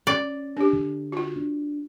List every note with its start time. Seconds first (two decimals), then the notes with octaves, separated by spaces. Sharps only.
0.07 C#4 D5
0.57 D4 G4
0.73 D3
1.12 F4 F#4
1.36 D4